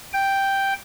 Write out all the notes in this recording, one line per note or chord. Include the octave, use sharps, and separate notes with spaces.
G5